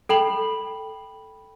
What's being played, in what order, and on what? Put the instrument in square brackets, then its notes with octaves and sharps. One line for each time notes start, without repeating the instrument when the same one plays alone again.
[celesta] A4 G5 B5 F#7